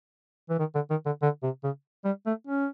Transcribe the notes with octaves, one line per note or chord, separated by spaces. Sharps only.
E3
D#3
D3
D#3
D3
D3
C3
C#3
G3
A3
C#4